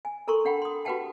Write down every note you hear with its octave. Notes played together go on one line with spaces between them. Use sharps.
G#5
A4 A#4 A#5 C6 C#6
D4 F#5 G5 B5
C6 D#6
F#4 G4 B4 F#5 G5 A5